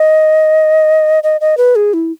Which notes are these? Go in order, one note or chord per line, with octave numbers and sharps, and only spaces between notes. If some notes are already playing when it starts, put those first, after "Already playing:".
Already playing: D#5
D#5
D#5
B4
G#4
E4